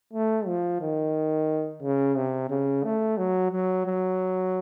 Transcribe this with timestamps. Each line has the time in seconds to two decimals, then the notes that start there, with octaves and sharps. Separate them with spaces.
0.13 A3
0.47 F3
0.81 D#3
1.82 C#3
2.16 C3
2.50 C#3
2.84 A3
3.17 F#3
3.52 F#3
3.86 F#3